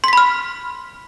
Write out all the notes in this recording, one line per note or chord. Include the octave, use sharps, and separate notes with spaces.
B5 C6 F6 B6